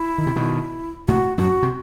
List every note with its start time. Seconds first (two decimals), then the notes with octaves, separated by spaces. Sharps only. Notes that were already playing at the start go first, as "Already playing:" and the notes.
Already playing: E4
0.18 D#3
0.27 C3
0.36 B2 D#3
1.08 A2 C3 F#4
1.38 F#2 A2 F#4
1.63 C3